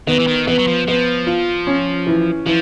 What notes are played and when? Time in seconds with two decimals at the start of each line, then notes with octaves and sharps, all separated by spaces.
0.07 D#3 B3
0.19 E3
0.27 D#3
0.47 E3 B3
0.59 F#3
0.67 F3
0.87 F3 B3
1.27 F4
1.67 C#4
2.07 E3
2.46 E3 F3